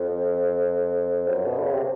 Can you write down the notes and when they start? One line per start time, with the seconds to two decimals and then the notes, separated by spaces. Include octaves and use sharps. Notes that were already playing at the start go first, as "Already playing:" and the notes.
Already playing: F2
1.28 F#2
1.46 B2
1.57 D3
1.63 C#3
1.74 C3